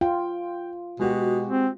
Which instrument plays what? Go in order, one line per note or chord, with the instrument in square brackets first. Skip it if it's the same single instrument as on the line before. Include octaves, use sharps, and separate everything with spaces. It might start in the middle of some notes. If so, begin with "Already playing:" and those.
[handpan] F4 [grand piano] G5
[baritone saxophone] B2 [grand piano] G#3 F#4 G4
[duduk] C4